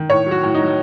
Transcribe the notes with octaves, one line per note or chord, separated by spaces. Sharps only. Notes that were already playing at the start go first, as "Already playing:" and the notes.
Already playing: D#3
A2 C#5
F#3 F#4
A2
F#3 D#4